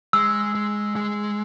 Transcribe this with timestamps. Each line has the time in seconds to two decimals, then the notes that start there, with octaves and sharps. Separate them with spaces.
0.13 G#3 E6
0.55 G#3
0.96 G#3